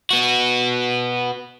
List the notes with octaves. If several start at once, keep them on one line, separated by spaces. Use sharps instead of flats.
B3 F#4